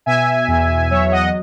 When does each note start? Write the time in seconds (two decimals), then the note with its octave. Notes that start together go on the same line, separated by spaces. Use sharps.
0.06 B2 E5 G#5
0.48 E2
0.91 F#3 C#5 E5
1.12 D#5 F#5